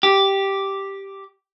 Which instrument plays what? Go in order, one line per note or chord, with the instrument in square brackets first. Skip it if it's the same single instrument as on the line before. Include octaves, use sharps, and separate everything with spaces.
[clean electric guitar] G4